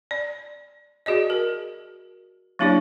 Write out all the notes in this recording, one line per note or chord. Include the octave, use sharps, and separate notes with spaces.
D5
F#4 G#4 D5 D#5
A#4
F#3 A#3 D4 E4 G4 D5